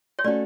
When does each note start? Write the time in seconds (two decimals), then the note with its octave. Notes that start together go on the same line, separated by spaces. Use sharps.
0.19 C#5
0.24 A3 C#4 F#4 A4 D5